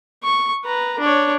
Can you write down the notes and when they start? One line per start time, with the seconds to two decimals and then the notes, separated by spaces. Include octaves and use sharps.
0.24 C#6
0.65 B4 A#5
0.99 D4 C#5